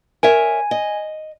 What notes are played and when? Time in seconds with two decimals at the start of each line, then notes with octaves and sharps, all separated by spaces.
0.23 A#4 C#5 E5 G#5
0.71 D#5